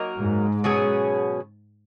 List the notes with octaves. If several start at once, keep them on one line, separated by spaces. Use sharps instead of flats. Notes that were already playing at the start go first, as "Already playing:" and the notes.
Already playing: F#3 A#3 D#4 A#4
G#2
B2 F#3 C#4 G#4